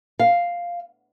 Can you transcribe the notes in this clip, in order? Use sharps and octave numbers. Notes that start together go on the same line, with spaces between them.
F5